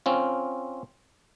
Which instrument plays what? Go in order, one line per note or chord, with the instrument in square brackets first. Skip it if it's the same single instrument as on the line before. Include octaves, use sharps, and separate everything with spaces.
[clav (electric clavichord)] C4 C#4 F4